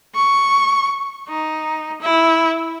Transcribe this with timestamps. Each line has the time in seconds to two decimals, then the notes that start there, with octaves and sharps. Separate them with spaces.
0.15 C#6
1.29 D#4
2.01 E4